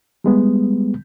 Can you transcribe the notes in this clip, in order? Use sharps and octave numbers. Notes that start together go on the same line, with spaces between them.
G3 G#3 B3